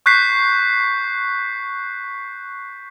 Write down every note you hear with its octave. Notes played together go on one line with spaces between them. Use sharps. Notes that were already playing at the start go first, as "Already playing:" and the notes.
C#6 F#6 G6 B6 C7